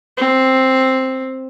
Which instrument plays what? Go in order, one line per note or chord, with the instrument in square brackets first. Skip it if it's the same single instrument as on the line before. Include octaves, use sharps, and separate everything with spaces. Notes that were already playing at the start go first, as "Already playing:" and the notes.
[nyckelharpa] C4